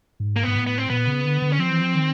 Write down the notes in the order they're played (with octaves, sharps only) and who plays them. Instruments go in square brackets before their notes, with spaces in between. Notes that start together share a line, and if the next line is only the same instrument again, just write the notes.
[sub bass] G#2
[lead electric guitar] A#3
[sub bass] G#2 [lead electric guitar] B3
[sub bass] A2
[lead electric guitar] B3
C4
[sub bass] A#2 [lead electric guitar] B3
[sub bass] C#3
D3
D3
[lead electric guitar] C#4
[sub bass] F3 [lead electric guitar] C4
[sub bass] E3
F3
D#3